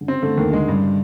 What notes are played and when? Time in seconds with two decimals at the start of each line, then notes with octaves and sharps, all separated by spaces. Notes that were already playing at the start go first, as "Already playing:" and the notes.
0.01 D3
0.07 C#3 C4
0.23 D3 A3
0.37 D#2 D#3
0.52 D3 G#3
0.67 G2 C#3